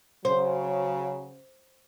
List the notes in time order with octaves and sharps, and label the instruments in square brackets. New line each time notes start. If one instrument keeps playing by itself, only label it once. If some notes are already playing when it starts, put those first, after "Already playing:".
[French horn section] C#3 F#3 [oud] C5